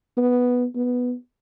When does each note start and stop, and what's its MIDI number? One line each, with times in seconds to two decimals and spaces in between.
0.17 0.65 59
0.76 1.14 59